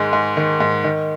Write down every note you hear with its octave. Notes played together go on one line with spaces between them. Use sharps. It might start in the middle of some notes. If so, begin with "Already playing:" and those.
Already playing: G#2 D#3 G#3
G#2
D#3
G#2
D#3